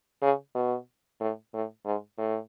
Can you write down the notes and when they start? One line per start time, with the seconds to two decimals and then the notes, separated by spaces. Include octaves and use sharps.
0.22 C#3
0.55 B2
1.20 A2
1.54 A2
1.85 G#2
2.18 A2